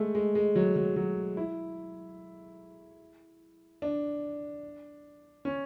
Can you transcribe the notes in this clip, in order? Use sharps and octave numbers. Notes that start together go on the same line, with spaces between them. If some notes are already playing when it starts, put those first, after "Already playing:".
Already playing: G#3 A3
G#3
G#3
F#3
F#3
F#3
E4
D4
C#4